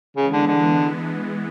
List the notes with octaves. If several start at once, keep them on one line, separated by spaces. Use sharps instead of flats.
C#3 E3 G#3 B3
D3
D3